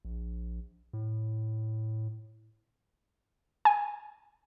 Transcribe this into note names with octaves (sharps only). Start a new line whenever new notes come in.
A#1
A2
G#5